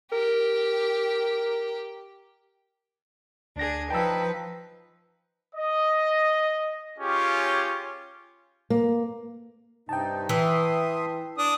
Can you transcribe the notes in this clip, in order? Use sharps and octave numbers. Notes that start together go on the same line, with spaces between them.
G4 A#4
D2 D4 G#4 A#6
F3 D#4 B4 G5 A5 E6
D#5
C#4 F4 G4 G#4 C#5
A#3
G2 C3 D#4 G5 A5
E3 E5 C6 D#6
D4 D#6